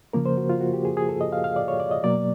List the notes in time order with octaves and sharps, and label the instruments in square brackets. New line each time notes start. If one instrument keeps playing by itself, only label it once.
[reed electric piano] C#3 F3 A#3 A#4
C5
F#4
F4
F#4
G4
G#4
G#4
A4
D#5
F5
F5
D5
C#5
D5
D#5
B2 F#3 A#3 D5